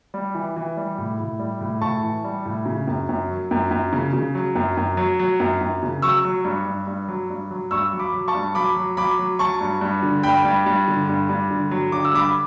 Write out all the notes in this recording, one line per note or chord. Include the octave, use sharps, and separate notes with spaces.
G3
E3
E3
G3
A2
A2
G3
A2
A2 A5 C#6
E3
G3
A2
C#3
F#2
F#2
F#3
F#2
F#2
C#3
C#3
F#3
F#2
F#2
F#3
F#3
F#2
F#2
C#3
F#3 C#6 E6
F#3
G2
G2
G2
F#3
G2
F#3
G2 C#6 E6
F#3
B5 D6
F#3
A5 C#6
G2
F#3 B5 D6
F#3
F#3 B5 D6
F#3
F#3 A5 C#6
G2
G2
D3
G2 G5 B5
G2
G2
D3
G2
G2
D3
F#3
D3 D6
E6
G2 B5 D6